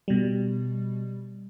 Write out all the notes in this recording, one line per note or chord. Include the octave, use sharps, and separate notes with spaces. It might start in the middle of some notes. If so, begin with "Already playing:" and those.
B2 G3